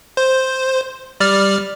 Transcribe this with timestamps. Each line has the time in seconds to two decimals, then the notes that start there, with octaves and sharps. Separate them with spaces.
0.17 C5
1.20 G3 D5 F6